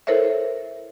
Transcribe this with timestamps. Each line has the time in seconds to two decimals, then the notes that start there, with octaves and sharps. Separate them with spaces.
0.07 E4 A4 A#4 C5 C#5 E5